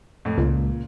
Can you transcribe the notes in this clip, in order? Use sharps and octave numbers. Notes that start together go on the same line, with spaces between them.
F2 A2
C#2 A#2